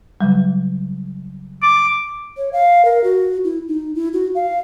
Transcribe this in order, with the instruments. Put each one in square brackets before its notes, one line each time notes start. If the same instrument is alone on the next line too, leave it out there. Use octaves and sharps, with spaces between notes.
[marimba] C#3 F#3 G3
[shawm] D6
[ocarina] C#5
F5
A#4
F#4
E4
D#4
E4
F#4
F5